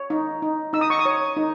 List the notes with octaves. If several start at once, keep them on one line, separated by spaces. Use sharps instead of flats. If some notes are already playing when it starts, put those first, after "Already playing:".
Already playing: C#5
D#4
D#4
D#4 E6
D#6
C#6
D#6
C#5
D#4